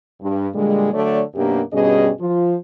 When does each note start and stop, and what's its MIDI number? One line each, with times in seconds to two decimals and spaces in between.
0.21 0.48 43
0.54 0.89 46
0.54 0.89 50
0.54 0.89 55
0.54 0.89 56
0.92 1.20 50
0.92 1.20 54
0.92 1.20 57
0.92 1.20 73
0.92 1.20 74
1.35 1.60 42
1.35 1.60 47
1.35 1.60 58
1.35 1.60 62
1.35 1.60 67
1.72 2.09 43
1.72 2.09 47
1.72 2.09 55
1.72 2.09 61
1.72 2.09 68
1.72 2.09 75
2.20 2.55 53
2.20 2.55 65